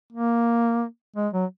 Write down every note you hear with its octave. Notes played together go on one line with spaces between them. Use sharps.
A#3
G#3
F#3